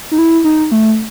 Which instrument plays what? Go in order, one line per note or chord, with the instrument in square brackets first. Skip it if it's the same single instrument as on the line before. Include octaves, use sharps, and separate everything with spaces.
[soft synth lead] D#4
E4
D#4
A3